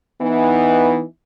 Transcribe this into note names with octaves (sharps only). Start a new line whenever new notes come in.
E3 B3 D#4